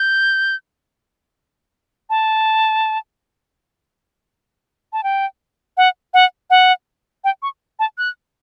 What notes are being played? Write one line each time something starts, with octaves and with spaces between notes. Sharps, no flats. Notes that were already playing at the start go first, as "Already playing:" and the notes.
Already playing: G6
A5
A5
G5
F#5
F#5
F#5
G5
C#6
A5
F#6